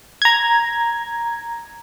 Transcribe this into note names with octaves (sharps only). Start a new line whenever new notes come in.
A#5 G#6